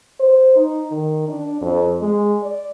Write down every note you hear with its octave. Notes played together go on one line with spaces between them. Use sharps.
C5
D#4
D#3
D4
F2
G#3
D5